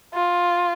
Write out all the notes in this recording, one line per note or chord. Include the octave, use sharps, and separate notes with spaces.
F4